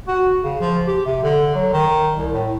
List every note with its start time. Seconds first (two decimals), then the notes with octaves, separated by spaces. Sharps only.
0.08 F#4
0.43 C#3
0.61 F3
0.87 G4
1.06 C3
1.23 D3
1.55 F#3
1.73 D#3
2.17 C2
2.33 A2